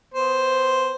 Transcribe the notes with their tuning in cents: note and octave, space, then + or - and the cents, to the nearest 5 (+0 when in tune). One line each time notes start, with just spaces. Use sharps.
B3 +20 C5 +0